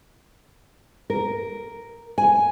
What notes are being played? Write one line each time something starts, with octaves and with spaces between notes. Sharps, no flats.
A#4
G#5